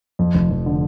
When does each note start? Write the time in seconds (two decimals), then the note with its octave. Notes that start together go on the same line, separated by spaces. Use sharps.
0.19 F2
0.34 F1
0.51 F2
0.66 D3